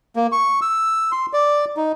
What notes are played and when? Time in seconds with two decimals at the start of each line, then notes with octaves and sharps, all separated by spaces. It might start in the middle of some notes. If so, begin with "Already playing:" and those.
0.16 A#3
0.32 C#6
0.62 E6
1.12 C6
1.33 D5
1.77 D#4